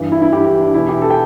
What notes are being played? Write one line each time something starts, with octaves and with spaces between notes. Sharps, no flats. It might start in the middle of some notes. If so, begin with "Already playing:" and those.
Already playing: G2 E3
E4
E4
G2 E3 G4
G4
D4
E2 B2 E4
G4
A4
G5